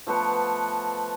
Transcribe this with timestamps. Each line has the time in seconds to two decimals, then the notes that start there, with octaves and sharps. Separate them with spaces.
0.07 F3 A3 B3 F#5